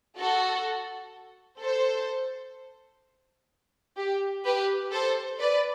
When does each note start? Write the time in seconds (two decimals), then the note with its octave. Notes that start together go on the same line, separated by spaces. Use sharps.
0.18 F#4 A4
1.60 A4 C5
3.97 G4
4.44 G4 B4
4.92 A4 C5
5.39 B4 D5